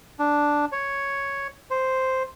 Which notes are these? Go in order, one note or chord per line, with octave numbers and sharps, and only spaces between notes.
D4
C#5
C5